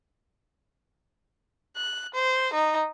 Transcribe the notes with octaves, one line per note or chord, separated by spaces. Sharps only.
F#6
C5
D#4